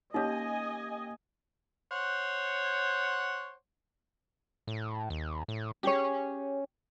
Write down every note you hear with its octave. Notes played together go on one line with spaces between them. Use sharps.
A#3 C#4 D#4 G4 C#5 D#5 G#5
C5 C#5 F#5
A2
D#2
A2
C#4 G4 G#4 C#5